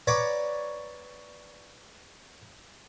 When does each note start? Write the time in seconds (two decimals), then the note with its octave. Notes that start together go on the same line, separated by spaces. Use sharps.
0.07 B4 C#5 D5 F#5 A#5 B5